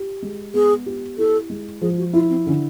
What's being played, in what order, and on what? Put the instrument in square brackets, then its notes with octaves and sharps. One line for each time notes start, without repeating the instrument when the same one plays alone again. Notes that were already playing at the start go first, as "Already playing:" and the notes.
Already playing: [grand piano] G4
G#3
[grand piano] B3 [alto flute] G#4
[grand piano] G4
[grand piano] E4 [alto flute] A4
[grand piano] G#3
[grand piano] F3 [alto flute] G#4
[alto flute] F#4
[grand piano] E4 [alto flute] F4
[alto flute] C4
[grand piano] D3 [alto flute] C#4